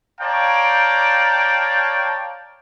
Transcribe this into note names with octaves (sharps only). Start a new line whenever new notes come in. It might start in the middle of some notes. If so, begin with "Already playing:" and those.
C#5 D5 F5 G5 A5 A#5